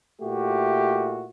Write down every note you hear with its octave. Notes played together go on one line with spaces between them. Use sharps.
A#2 A3 E4 F#4 G4